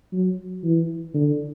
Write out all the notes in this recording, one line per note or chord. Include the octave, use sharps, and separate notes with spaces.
F#3
E3
D3